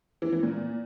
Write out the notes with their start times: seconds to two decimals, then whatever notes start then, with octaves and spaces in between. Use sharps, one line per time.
0.22 E3
0.32 E3
0.43 A#2